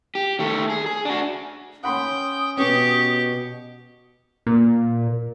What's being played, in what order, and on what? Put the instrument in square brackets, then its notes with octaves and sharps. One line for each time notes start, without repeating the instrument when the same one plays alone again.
[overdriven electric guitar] G4
D#3 A3
G#4
G#4
D4 F#4
[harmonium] C#4 [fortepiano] F#5 B5 C6 [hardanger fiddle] G5 [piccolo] D#6
[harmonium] B2 [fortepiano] B3 C#4 [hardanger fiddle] G4 C#6
[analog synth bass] A#2